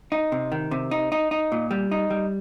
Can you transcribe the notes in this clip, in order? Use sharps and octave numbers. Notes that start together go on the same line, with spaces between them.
D#4
C3
D#3
C3
D#4
D#4
D#4
A#2
G3
D#4
G3